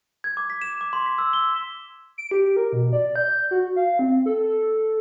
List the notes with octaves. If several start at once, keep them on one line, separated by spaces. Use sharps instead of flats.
G#6
D6
B6
E7
D6
C6
B6
E6
G7
D7
G4
A#4
B2
D5
G6
F#4
F5
C4
A4